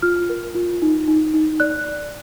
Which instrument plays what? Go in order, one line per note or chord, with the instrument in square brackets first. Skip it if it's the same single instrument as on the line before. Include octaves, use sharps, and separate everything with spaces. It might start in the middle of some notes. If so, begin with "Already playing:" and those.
[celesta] F4 F6
A#4
F4
D#4
D#4
D#4
D5 F#6